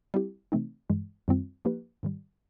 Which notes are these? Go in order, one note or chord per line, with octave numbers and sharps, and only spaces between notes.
G3 C4 E4 G4
C3 E3 A3 C4 D#4
G2 E3 G#3
F#2 D#3 G3 C4 F4
F3 A#3 D#4 G4 B4
G#2 D#3 G3